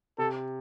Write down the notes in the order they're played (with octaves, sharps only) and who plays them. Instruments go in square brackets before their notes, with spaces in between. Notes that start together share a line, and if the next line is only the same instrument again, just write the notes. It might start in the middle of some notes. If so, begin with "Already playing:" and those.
[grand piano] C3 [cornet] A4